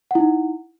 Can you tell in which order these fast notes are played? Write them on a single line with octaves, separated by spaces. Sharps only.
F#5 E4 D#4